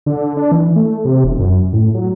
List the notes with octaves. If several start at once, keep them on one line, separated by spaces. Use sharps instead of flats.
D3
D4
E3
A3
C3
E1
F#2
A2
F#3